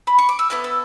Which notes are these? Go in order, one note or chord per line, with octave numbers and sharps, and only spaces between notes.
B5
C#6
D6
E6
B3 E4 A4 F#6
E6